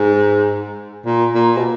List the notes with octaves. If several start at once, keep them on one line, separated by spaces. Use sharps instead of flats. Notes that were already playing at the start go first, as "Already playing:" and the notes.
Already playing: G#2
A#2
A#2
B2